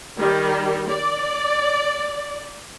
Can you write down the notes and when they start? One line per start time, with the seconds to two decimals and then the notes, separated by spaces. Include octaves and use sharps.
0.18 D#3 G3
0.89 D5